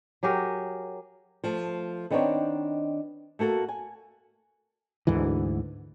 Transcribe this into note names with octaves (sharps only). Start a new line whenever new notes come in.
F#3 G4 G#4 A#4
F3 A3
D#3 B3 C4 D4 D#4 C#5
A3 A#3 F#4 A4
G#5
D2 G#2 D3 E3